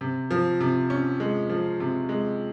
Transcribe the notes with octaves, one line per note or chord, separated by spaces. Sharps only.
C3
F3
C3
C#4
G#3
F3
C3
G#3